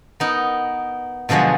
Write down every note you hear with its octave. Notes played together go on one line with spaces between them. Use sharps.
B3 D#4 A#4
B2 D3 F3 F#3 G#3